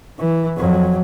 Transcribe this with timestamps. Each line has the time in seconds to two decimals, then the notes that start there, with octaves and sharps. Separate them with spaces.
0.19 E3
0.57 F2 F#3